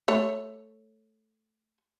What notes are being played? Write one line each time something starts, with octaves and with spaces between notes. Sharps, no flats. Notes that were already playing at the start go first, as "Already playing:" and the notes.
A3 C#5